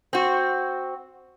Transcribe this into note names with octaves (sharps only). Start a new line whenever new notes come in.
C4 F#4